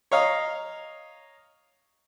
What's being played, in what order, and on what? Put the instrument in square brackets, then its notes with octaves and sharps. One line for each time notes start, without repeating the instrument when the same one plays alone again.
[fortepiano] C#5 D#5 F5 A#5